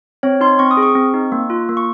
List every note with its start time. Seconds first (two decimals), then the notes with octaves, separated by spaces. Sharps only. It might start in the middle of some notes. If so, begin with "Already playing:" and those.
0.23 C4 C#5
0.41 D#4 C6
0.59 C4 C#6
0.71 D#6
0.77 G#4
0.83 C#6
0.95 C4
1.14 D#4
1.32 A#3
1.50 F4
1.69 A#3
1.77 C#6